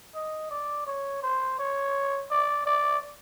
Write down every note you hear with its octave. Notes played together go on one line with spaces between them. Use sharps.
D#5
D5
C#5
C5
C#5
D5
D5